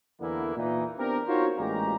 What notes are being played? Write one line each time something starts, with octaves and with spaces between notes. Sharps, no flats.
E2 D3 E3 A#3 B3 E4
A#2 E3 D#4
B3 C4 D4 G4 A#4
D#4 F4 F#4 A#4 C5 C#5
A1 A#2 G#3 G4 A#5